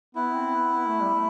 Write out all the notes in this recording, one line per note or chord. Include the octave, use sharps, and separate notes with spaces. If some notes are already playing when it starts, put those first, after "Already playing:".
B3 E4
C4
B3
B3
A3
G3
A3